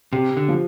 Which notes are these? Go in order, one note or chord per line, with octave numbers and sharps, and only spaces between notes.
C3 G4
D3
F3